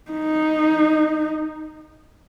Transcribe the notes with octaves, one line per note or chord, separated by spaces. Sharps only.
D#4